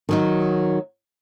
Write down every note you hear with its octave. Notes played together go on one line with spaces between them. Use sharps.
D#3 F#3 D#4